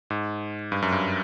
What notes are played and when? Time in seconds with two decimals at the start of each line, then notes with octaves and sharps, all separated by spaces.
0.10 G#2
0.72 G2
0.82 F#2
0.92 G2